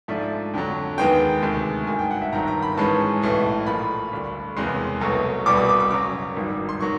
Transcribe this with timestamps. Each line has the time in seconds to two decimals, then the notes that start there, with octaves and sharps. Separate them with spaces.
0.08 G#2 F3 A3 D4 E5
0.54 F2 D3 F#3
0.98 D#2 D#3 G#3 B3 G5
1.42 D2 C3 D#3 G#3
1.87 G#1 G2 D#3 G#5
1.99 G5
2.11 F#5
2.22 E5
2.32 G1 G2 D#3 F#3 A#5
2.47 A#5
2.62 B5
2.77 G#2 E3 G#3 C#4 A5
3.22 B1 A2 E3
3.66 A#2 F3 A3 B5
4.12 D2 D3 G3
4.56 F#1 E2 C3 E3 G#3 C6
5.01 C2 B2 F#3 A3
5.46 C2 B2 G3 D6
5.57 D#6
5.69 D6
5.80 D6
5.91 F#2 C#3 F#3 D6
6.36 G#1 G2 D#3 G3
6.69 C6
6.80 D#3 F#3 C#6